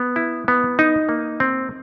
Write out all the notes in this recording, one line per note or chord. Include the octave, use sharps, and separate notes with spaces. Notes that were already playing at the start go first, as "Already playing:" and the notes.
Already playing: B3
E4
B3
D#4
A#3
C4